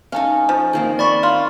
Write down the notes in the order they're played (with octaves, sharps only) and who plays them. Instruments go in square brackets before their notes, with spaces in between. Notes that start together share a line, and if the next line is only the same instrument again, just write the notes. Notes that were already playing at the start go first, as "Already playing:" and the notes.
[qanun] C#4 D#4 [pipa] A4 F5
[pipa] F3
[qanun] D#3 A#3 C4
[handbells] D5 B5 C#6
[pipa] F4